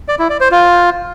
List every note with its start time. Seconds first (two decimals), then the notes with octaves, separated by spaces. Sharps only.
0.08 D5
0.19 E4
0.30 D5
0.41 C5
0.51 F4